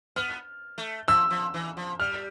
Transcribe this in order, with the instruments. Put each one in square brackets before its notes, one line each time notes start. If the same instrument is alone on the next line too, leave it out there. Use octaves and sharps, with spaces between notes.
[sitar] B3 [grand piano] F6
[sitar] A3
[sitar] F3 [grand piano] E6
[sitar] F3
E3
F3
[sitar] G3 [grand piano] F6